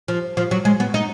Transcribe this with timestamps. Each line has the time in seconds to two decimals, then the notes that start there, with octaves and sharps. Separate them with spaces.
0.08 F3
0.37 F3
0.51 F#3
0.65 G#3
0.80 B3
0.94 D#4